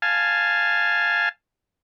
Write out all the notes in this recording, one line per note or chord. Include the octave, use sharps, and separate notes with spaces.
F5 G#5 A5